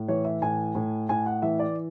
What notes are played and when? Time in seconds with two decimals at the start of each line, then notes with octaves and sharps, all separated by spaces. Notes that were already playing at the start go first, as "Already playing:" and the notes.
Already playing: A2
0.08 E3 C#5
0.25 E5
0.42 A2 G#5
0.75 A2
1.09 A2 G#5
1.26 F#5
1.42 E3 E5
1.59 D5